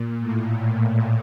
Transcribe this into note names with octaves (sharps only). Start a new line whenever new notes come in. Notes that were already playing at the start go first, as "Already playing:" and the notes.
Already playing: A#2
A2
A2